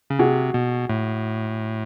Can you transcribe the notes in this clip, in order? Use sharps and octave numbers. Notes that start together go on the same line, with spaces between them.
C#3
C3 F#4 G#4
B2
A2